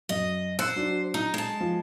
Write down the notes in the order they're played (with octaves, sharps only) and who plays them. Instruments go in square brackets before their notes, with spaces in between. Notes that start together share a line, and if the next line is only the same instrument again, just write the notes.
[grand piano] F#2 [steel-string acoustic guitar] D#5
[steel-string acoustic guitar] C5 [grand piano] E6 F#6 C#7
[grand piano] F#3 D4
[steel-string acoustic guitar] D#4
G#3 A5
[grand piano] F3